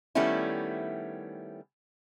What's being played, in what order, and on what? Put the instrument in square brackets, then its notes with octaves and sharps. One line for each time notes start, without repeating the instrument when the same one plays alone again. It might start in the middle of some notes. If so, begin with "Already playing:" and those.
[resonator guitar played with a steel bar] D#3 G3 A3 B3 C#4 E4